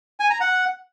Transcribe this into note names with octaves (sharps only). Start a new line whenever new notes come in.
G#5
A#5
F#5